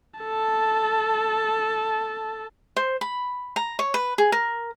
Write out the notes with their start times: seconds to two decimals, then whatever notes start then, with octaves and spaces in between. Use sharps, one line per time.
0.20 A4 A5
2.76 C5
3.01 B5
3.56 A#5
3.79 C#5
3.94 B4
4.18 G#4
4.32 A#4